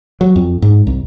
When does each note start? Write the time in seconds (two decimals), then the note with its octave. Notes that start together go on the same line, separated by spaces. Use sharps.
0.21 F#3
0.36 F2
0.62 G#2
0.87 C2